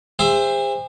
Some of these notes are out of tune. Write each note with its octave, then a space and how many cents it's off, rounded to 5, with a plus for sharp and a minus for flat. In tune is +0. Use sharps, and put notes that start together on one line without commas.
G#4 -45 C5 +0 E5 +10